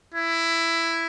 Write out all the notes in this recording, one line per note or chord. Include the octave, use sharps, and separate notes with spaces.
E4